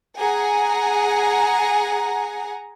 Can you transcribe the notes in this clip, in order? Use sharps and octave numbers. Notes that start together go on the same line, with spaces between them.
G#4 F#5 G#5 A#5